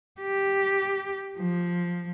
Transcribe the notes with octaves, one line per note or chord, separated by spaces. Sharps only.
G4
F3